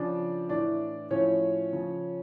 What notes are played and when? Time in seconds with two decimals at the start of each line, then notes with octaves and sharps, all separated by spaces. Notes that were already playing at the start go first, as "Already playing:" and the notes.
Already playing: C#3 F3 D4 D5
0.49 A2 E3 D4 D5
1.10 A2 F3 C#4 C#5
1.72 C#3 F3